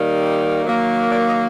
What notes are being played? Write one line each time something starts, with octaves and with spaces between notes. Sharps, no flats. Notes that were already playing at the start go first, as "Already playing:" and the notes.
Already playing: D#3 G3 A#3 D#4
D#3 F#3 A#3
D5
D#5